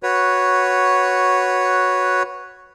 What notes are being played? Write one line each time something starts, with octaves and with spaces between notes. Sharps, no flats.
F#4 B4 C#5